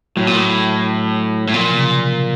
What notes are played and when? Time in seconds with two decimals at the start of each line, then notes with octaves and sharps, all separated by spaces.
0.17 A2 F#3
0.27 A#2
0.37 A2
1.48 A2
1.54 A#2 F3
1.70 C3
1.77 C#3